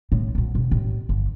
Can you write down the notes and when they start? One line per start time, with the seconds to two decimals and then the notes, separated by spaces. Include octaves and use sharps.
0.12 A2
0.35 A#1 F#2
0.55 E1
0.71 A1
1.09 G1